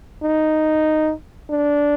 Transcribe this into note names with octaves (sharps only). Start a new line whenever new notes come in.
D#4
D4